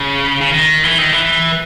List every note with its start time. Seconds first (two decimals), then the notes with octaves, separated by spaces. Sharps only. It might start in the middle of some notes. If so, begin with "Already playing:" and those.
Already playing: C#3
0.41 C#3
0.50 D#3
0.84 E3
0.98 D#3
1.12 E3